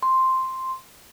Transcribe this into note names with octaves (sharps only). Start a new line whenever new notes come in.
C6